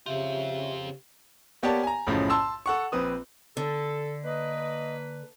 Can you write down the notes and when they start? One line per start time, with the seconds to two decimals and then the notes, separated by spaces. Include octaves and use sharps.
0.06 C#3 C4 F4 G4 E5
1.63 A#3 B3 G4 C#5 D5 A5
1.83 G#5 A#5
2.07 B1 F#2 A2 C#3 F3
2.30 A5 C6 E6
2.66 A4 F#5 C#6
2.92 A#1 C4 B4 D#6
3.57 D3 A4
4.24 A#3 B4 D#5